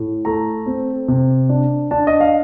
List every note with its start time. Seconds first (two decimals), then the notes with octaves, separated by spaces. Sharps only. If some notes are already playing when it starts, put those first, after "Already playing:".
Already playing: A2
0.25 A3 A#5
0.66 C4
1.08 C3
1.49 D4
1.91 D4 A5
2.07 D#5
2.21 F5